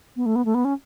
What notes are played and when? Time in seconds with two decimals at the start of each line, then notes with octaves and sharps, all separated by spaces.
0.16 B3
0.26 A3
0.35 B3
0.45 A3
0.54 B3
0.65 C#4